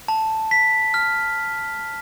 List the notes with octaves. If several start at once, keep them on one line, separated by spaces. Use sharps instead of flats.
A5
B6
F6